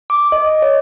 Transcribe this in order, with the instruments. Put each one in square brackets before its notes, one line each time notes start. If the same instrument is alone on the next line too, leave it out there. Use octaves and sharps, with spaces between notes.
[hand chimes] D6
D#5
C#5